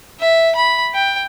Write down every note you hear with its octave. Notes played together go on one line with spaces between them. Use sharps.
E5
B5
G5